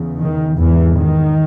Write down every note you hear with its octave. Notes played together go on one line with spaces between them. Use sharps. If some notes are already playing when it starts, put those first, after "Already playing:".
Already playing: E2 C#3
D#3
E2 G#2 E3
D#3